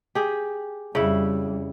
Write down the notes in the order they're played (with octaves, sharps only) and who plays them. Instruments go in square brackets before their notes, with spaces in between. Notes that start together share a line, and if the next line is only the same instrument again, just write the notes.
[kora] G4 G#4
[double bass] F2 G3 [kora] C#3 E4